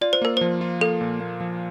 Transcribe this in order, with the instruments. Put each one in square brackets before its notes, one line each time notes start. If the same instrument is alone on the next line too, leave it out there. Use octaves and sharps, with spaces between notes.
[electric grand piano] F4 [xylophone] D5
[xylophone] C5
[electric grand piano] A#3 [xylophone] A#4
[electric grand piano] F3 [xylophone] C5
[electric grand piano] F4
[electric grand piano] A#3 [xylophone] A4
[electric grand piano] A#2
A#3
F3